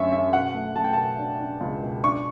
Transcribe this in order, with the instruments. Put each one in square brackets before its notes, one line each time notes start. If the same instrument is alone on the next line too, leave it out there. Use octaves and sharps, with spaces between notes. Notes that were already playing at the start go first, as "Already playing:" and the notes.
Already playing: [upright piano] F#2 D3 A3 C#4 E5 C#6
C#4 E5
B2 F#5
A3
A3 A5
G5
B2 A5
D4
D4
C#2
B2
D4 C#6